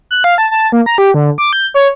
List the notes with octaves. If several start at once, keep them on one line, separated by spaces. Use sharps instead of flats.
F#6
F5
A5
A5
A#3
A#5
G4
D3
D6
G6
C#5